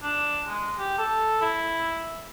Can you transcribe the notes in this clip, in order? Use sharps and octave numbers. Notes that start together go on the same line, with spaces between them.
D4
G#3
G4
A4
E4